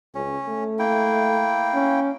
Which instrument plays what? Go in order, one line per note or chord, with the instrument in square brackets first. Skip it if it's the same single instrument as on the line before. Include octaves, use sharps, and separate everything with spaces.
[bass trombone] C#2 [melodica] C#4
[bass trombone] A3
[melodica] A#3 E4 G5
[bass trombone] C#4